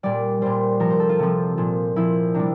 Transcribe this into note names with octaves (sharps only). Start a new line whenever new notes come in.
A#2 G3 D5
A#2 G3 C5
C3 F3 A#4
C5
A4
F4
C3 F3
A#2 F3
A#2 F3 E4
C3 G3 D4